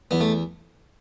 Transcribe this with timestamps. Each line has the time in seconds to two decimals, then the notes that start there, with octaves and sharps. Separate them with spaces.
0.11 E2 B3
0.21 A3